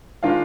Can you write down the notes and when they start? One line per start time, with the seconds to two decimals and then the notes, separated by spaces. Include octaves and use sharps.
0.23 D#3 G#3 D4 F4 F5